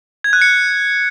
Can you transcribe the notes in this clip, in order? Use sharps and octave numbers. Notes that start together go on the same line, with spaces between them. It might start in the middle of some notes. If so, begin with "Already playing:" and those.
G#6
F#6
C#7